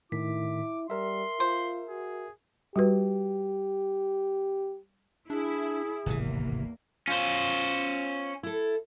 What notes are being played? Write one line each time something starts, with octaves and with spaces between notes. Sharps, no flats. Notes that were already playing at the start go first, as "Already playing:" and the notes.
A2 D#3 E4 D6 B6
G3 A#4 E5 C6
F4 C5
F#4 G#4
G3 F#4 G4 B4
D4 E4 G#4
D1 G#1 E2 C3 E3 A#3
C#4 F4 C5
E4 A4